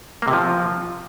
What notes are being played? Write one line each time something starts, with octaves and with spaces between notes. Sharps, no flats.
A#3
C3
F3